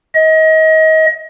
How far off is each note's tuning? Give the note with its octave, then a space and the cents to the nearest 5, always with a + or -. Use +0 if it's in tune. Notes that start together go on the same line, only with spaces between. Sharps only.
D#5 +30